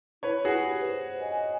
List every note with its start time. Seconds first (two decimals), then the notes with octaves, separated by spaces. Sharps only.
0.23 E4 B4 C#5
0.45 F#4 G#4
0.55 G4 B4
0.86 C5
1.19 D#5 G#5